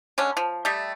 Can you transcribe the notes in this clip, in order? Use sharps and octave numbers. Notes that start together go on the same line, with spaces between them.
D3 G#3 C#4
F3
G3 A3 G4 D#5